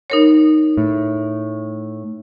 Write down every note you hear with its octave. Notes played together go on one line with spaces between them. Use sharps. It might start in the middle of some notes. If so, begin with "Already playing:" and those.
D#4 A#4 C#5
A2